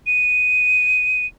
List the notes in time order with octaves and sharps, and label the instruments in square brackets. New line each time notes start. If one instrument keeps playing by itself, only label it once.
[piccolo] D#7